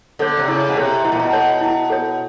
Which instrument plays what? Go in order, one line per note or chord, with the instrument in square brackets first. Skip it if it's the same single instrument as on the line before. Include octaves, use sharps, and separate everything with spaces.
[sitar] D3 [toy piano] A4 C#5
[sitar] C3
[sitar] C#3 [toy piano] E4
[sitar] B2
[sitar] C3 [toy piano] A4 C#5
[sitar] B2 [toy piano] E4
[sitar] A#2
B2
[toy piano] A4 C#5
E4
A4 C#5